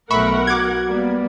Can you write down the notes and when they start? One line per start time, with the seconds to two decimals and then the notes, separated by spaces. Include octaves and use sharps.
0.10 B1 A3 A#4 E5 F#5 B5 C#6
0.47 F#4 D6 G#6
0.86 G3 A#3 B3